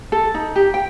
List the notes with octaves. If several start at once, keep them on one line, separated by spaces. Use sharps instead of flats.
A4
D#4
G4
G5